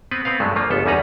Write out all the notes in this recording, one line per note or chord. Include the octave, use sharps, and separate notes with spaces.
B3 C4 B4
B3 C4 B4 F5
G2 F#3 G#3 A3
F3 A#3 F4
G1 C#2 B3 A4
E2 G3 C#4 D#4 B4 A#5